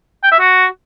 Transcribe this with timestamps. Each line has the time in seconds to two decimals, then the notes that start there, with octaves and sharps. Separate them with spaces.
0.23 G5
0.32 E5
0.40 F#4